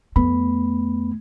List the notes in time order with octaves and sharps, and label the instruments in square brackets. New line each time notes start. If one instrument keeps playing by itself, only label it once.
[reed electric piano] F2 B3 B5 [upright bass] A3